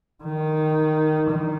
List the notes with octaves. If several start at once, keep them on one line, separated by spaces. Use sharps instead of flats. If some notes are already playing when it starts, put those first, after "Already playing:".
D#3
D#3